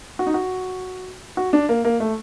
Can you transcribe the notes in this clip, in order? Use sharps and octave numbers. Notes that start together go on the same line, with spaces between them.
F#4
D#4
F#4
F#4
D4
A#3
A#3
A3